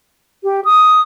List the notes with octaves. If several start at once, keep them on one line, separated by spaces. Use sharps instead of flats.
G4
D#6